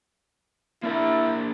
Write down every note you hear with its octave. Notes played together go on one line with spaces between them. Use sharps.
A#3 D4 E4 A#4